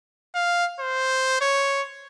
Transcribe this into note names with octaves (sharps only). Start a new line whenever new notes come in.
F5
C5
C#5